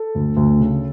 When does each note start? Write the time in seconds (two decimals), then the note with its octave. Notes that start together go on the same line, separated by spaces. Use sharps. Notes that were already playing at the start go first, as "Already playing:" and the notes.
Already playing: A4
0.15 D2
0.37 D2
0.60 C#3